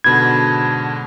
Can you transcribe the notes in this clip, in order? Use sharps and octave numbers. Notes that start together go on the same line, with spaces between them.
G#2 B2 D3 A5 B5 G#6